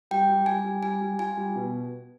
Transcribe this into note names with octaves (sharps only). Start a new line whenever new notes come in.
G3 G5
G3
G3 G#5
G3
G3 G#5
G3
F4 G#5
G3
B2